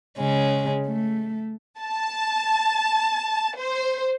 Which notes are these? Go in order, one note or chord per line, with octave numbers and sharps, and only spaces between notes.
C#3 G#3 C#4
A3
A5
C5